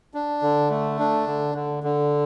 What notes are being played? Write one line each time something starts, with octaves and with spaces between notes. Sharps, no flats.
D4
D3
A3
D4
D3
D3
D3